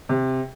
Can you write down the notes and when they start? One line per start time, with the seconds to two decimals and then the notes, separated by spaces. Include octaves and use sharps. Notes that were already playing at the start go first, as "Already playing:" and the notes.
0.09 C3